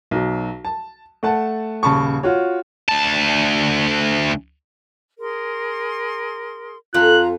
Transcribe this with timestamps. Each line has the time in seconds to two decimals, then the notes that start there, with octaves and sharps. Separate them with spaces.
0.11 B1 F#3
0.65 A5
1.23 A3 F#5 A5
1.83 D#1 C#3 A5 B5 C#6
2.23 F4 F#4 C#5
2.88 D2 A5
5.19 G#4 A#4 C6
6.94 F2 F4 A#5 F#6